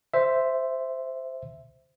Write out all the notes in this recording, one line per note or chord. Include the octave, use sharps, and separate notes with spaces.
C5 E5